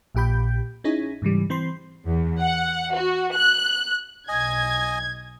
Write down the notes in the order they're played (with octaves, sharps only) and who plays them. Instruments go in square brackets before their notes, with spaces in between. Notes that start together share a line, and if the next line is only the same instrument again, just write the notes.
[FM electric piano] A#1 A#2 G4 B5 G6
C#4 D#4 E4 G#4 C#5
G#2 C#3 E3 G3
E3 C4 C5 B5 C6
[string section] E2
F#5
F#4
F#6
[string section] B1 G#6 [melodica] D#5 G#5